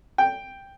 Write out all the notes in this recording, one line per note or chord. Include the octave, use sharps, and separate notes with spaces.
G5